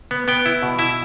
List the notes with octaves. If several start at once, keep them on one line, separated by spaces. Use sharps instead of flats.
B3
B3 G5
E4
B2
E4 E5